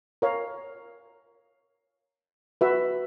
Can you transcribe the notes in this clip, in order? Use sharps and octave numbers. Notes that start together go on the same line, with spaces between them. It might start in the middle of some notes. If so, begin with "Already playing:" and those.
A#4 C#5 F5
F#4 B4 E5